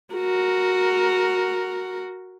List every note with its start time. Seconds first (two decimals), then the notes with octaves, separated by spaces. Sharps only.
0.15 F#4 A#4